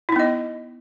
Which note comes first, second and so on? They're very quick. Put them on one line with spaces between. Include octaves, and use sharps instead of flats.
E4 D#4 B3 D#5